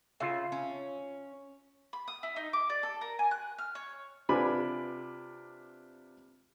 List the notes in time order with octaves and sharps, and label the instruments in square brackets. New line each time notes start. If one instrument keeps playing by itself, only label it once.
[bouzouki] C#3 [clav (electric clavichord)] F4 E5
[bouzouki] C#4
[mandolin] B5
D#6
E4
D#4
D6
D5
A4
A#4
G#5
F#6
F6
C#5
[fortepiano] C3 D4 F4 B4 G#5 B5